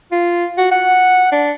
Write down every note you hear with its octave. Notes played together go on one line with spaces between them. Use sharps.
F4
F#4
F#5
D4